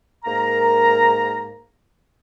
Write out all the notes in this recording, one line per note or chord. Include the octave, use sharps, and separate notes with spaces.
G#2 A#3 A#4 A#5